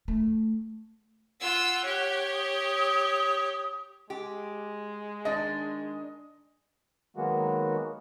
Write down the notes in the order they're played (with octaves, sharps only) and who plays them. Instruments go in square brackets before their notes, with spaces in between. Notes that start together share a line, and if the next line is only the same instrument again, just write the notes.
[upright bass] A3
[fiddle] F4 E6 [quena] F#5
[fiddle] G4 C#5
[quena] D#6
[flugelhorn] G#3 [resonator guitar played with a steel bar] G4
[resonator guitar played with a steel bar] D#3 D4 [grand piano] D#5
[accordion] D#3 F#3 G#3 A#3 B3 F#4